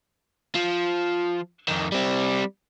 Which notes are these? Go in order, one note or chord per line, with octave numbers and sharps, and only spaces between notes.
F3
F2 D#3
G3 C4